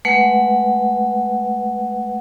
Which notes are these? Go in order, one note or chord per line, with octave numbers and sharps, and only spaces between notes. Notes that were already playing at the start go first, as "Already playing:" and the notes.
G#3 A3 B4 F#5